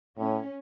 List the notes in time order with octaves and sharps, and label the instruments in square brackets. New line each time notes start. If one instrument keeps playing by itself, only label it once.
[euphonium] A2 [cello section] C#4